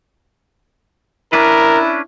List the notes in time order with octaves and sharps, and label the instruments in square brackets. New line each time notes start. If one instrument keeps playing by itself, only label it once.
[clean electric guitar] C#4 D4 B4 [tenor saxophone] E4 [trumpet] A#4